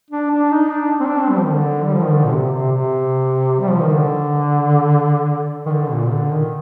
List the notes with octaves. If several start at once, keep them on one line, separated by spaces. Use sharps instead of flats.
D4
D4
D#4
D4
C4
D4
C4
G3
F3
D#3
D3
G3
F3
D#3
D3
A#2
C3
C3
C3
G3
F3
D#3
D3
D#3
D3
A#2
D3
D#3